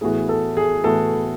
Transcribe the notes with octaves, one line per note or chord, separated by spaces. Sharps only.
A2 E3 B3 F#4 G#4
A4
G#4
A2 E3 B3 F#4 A4